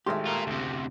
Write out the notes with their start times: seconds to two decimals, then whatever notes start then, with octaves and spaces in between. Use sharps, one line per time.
0.06 G#1 G#3 A3 G4 C6
0.26 F4 A#4
0.47 D2 C3